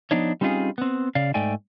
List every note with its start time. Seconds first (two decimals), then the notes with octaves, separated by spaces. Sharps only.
0.11 F3 B3 D4 D#4 C#5
0.41 G3 C4 C#4 D#4 F4 G#4
0.78 B3 C4
1.15 C#3 D5 F5
1.34 G#2 A3 D5 G5 G#5